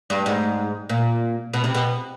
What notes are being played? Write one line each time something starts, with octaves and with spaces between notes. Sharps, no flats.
G2
G#2
A#2
B2
C3
B2